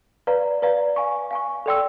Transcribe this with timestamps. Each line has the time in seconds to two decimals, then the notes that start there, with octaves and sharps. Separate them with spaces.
0.27 B4 D5 F5 A#5
0.62 B4 D5 F5 A#5
0.96 F5 G#5 C#6
1.31 F5 G#5 C#6
1.66 A4 D5 G5 C6 E6